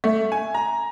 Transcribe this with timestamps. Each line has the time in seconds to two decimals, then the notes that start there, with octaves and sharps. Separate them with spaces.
0.04 A3
0.32 G#5
0.54 A#5